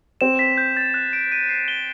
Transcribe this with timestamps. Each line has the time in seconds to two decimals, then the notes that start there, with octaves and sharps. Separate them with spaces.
0.21 C4 E7
0.39 B6
0.58 G6
0.77 A6
0.94 F#6
1.13 D7
1.32 D#7
1.49 C7
1.68 G7